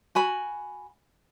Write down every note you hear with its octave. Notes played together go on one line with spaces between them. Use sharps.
F#4 G#5 B5